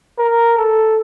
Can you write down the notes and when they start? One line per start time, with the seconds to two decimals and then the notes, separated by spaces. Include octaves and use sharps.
0.19 A#4
0.57 A4